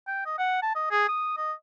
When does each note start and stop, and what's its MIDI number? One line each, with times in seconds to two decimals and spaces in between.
0.07 0.26 79
0.26 0.35 75
0.38 0.59 78
0.63 0.73 81
0.75 0.88 75
0.91 1.08 68
1.08 1.36 87
1.37 1.52 75